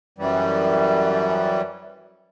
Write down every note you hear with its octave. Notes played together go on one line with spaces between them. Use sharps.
F#2 E3 G3